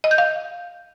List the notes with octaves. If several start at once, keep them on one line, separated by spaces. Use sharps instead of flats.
D#5
G6
F5